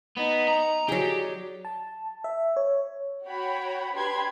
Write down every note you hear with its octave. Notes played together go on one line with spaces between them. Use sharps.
B3 D#4
A#5
F#3 G4 G#4 D5
A5
E5
C#5
F#4 C#5 G5 B5
D4 G4 B4 B5 C6 G#6